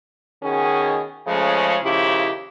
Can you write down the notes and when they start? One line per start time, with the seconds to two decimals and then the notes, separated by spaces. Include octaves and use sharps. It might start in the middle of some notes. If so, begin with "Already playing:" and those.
0.43 B2 D#3 C#4 G#4
1.28 C#3 F3 G#3 A3 C#4
1.83 D#2 C#3 F3 E4 G4